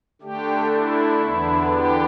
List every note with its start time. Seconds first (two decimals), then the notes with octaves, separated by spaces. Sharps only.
0.22 D3 A3 D4 G4
0.72 E4
1.22 E2 D3 B3 D4
1.73 G4